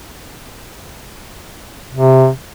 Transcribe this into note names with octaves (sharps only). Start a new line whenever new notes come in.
C3